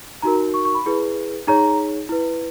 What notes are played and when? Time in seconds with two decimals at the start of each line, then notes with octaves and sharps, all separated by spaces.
0.22 D#4 F#4 A#4 A#5
0.54 C#6
0.65 C#6
0.75 B5
0.86 E4 G#4 B4
1.47 D#4 G#4 C#5 A#5
2.09 E4 B4